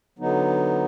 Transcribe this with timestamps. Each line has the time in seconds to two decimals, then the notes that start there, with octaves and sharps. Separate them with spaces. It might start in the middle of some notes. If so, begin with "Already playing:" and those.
0.19 D3 F#3 B3 D#4